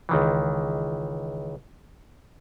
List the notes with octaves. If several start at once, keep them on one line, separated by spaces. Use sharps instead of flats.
C#2 D#3 E3